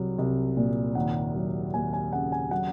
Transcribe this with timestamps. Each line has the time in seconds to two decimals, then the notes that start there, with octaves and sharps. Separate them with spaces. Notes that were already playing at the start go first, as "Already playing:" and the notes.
Already playing: C2 F#3
0.18 C2
0.57 A#2
0.95 D#2 F#5
1.35 F#3
1.74 D#2 G#5
1.93 G#5
2.12 C#3 F#5
2.32 G#5
2.51 F#3 F#5